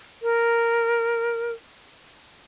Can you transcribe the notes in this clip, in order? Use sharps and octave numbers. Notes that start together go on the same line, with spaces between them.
A#4